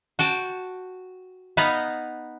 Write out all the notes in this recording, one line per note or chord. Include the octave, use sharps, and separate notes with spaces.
F#4 G5 A5
B3 D#4 B4 F5 F#5 A#5